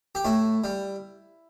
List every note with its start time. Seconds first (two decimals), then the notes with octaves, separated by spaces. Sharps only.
0.15 G4
0.25 A2 E4
0.64 G3